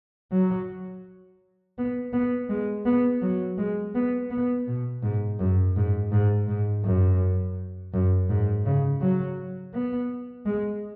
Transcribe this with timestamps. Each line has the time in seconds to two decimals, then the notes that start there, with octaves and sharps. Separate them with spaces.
0.32 F#3
1.78 B3
2.13 B3
2.50 G#3
2.86 B3
3.22 F#3
3.58 G#3
3.95 B3
4.31 B3
4.68 B2
5.03 G#2
5.40 F#2
5.76 G#2
6.12 G#2
6.48 G#2
6.84 F#2
7.94 F#2
8.29 G#2
8.66 C#3
9.01 F#3
9.74 B3
10.46 G#3